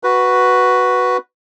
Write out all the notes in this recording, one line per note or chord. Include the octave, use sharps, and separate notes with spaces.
F#4 B4